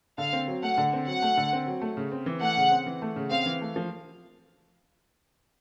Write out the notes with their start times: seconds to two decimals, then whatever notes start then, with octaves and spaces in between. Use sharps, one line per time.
0.18 D3 F5
0.33 C4
0.48 F#3
0.63 A3 F#5
0.78 D3
0.93 C4
1.07 F#3 F#5
1.22 A3
1.37 D3
1.53 C4
1.67 F#3
1.81 A3
1.97 C#3
2.12 C4
2.26 E3
2.41 A3 F#5
2.57 C#3
2.71 C4
2.86 E3
3.02 A3
3.16 C#3
3.31 C4 F5
3.46 E3
3.61 A3
3.76 F3